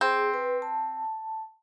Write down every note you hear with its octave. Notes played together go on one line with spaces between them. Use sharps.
C4 G#4
B4
A5